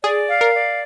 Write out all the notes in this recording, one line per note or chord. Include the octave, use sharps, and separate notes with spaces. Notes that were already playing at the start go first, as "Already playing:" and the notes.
G#4 D5
F5
A#4
D5